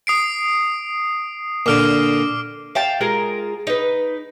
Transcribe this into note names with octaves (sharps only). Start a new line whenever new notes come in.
D#6 C7 D7
A#2 D3 D6 F6 D7
F5 G5 A5
G#3 F4 G#4 A#4
D#4 B4